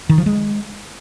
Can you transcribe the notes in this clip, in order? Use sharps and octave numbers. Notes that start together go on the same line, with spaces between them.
D#3
F3
G#3